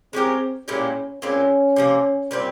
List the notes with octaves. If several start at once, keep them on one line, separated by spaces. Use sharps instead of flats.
G#3 C4 C#4 G4 A#4
A#2 G#3 C#4 E4 G4
A#2 G#3 C4 C#4 E4
C3 F3 A#3
A#2 G3 C4